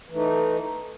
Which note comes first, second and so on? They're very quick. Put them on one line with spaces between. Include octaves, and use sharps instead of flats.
E3 A3 D#4